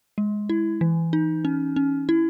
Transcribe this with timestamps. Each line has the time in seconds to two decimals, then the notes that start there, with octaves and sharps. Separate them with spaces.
0.18 G#3
0.49 E4
0.81 E3
1.13 D#4
1.45 C#4
1.76 C#4
2.09 E4